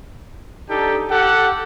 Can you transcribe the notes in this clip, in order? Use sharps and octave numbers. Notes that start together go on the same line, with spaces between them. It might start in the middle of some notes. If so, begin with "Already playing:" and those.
D4 D#4 G4 A4
G4 A4 F#5